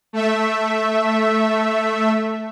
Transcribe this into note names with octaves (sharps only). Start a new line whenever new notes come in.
A3 E5